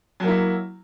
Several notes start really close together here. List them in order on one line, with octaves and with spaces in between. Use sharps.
F#3 A#3 E4